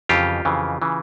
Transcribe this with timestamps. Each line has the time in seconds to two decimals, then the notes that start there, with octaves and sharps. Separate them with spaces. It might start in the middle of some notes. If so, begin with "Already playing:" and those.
0.09 F2 C#3 E3 F4 G4
0.45 F2 C#3 E3
0.82 C#3 E3